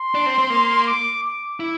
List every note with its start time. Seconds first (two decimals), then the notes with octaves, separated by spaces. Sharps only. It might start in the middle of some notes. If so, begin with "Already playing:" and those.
Already playing: C6
0.15 D4
0.26 C4
0.38 C4
0.50 A#3
0.87 D6
1.23 D6
1.60 E4